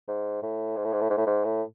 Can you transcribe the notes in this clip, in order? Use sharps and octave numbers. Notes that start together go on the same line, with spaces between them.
G#2
A2
G#2
A2
G#2
A2
G#2
A2
G#2
A2